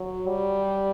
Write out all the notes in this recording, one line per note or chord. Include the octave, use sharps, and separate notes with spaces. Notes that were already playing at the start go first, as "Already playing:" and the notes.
Already playing: F#3
G3